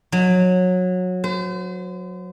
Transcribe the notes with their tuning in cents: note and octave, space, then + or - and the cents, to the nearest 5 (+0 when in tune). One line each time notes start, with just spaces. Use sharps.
F#3 -20
C5 -40